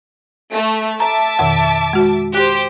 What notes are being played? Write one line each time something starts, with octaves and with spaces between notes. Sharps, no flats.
A3
E5 A5 A#5 D6
F2 B2 D#3
G#3 F#4
G4 C5 F#6